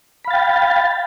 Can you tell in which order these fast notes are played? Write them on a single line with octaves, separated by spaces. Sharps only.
B5 F5 A6 G5